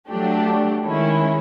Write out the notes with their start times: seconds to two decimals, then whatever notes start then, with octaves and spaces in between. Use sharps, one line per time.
0.09 F#3 A3 D4 G4
0.84 D#3 G#3 C#4 E4